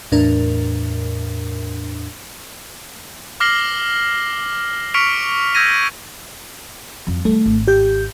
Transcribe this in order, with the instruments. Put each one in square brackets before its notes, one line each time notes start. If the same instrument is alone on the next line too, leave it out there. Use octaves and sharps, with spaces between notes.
[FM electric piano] E2 A2 D4 A#4
[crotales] D6 F6 A#6 C7 F#7 G7
C#6 F6 B6 C#7 D7 F7
E6 G6 G#6 A#6 D#7
[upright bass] F2 F3
[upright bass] D#3 G3 [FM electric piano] A3
[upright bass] G#1
[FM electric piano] G4 G6